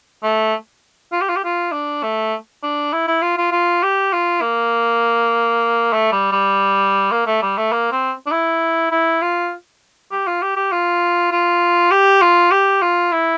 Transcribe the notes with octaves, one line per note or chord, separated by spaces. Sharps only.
A3
F4
G4
F4
G4
F4
D4
A3
D4
E4
E4
F4
F4
F4
G4
F4
A#3
A3
G3
G3
A#3
A3
G3
A3
A#3
C4
D4
E4
E4
F4
G4
F4
G4
G4
F4
F4
G4
F4
G4
F4
E4